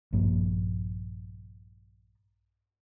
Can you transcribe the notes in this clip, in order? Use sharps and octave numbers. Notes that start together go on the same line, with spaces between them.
A#1 G2 F3 A#3